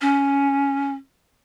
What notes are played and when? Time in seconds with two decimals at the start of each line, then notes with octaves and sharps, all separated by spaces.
0.01 C#4